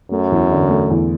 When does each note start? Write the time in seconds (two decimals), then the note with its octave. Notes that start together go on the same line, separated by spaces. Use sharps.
0.11 F#2 A3
0.31 E2
0.51 D3
0.70 A3
0.90 E2